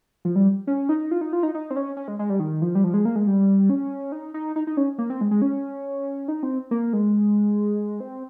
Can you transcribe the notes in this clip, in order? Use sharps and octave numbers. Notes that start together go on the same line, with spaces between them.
F3
G3
C#4
D#4
F4
D#4
F4
D#4
D#4
C4
C#4
C#4
G#3
G#3
G3
D#3
F3
G3
F3
G#3
A#3
G#3
G3
C#4
D#4
D#4
D#4
D#4
C#4
A#3
C4
G#3
G#3
C#4
D#4
C4
A#3
G#3
C4